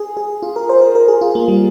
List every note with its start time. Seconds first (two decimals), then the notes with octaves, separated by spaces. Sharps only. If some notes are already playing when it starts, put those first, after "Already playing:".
Already playing: G#4
0.17 G#4
0.43 F4
0.56 A#4
0.69 C5
0.81 A#4
0.95 A#4
1.08 G#4
1.21 F4
1.35 A#3
1.48 G3